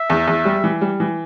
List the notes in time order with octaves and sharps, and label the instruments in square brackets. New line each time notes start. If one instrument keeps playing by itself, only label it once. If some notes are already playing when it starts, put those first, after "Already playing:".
Already playing: [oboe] E5
[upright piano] E2
E2
G3
E3
G3
E3